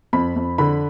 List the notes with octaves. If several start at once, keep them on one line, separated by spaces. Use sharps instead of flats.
F2 B5
F2
D3 B5